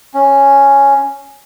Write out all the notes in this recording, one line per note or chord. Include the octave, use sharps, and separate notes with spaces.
C#4